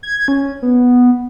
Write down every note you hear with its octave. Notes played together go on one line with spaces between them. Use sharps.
G#6
C#4
B3